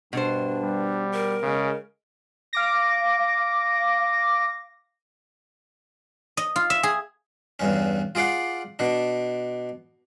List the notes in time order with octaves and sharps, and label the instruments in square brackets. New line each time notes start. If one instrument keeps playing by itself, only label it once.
[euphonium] G2 [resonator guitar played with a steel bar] B2 C5 [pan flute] D4
[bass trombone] G3
[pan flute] A#4
[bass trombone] C#3 [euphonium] G#3
[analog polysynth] F5 D6 A#6
[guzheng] D#5
F4
E5
G#4
[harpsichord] E2 G2 C#4
F4 G#4 D5 F5 F#5
B2 D4